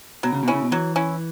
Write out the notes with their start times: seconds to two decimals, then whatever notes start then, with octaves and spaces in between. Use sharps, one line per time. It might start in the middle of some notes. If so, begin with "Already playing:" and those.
0.23 B2 F#3
0.32 C#3
0.43 B2
0.48 C#3 C#4 E4
0.62 B2
0.72 E3 F#3
0.96 C#4 E4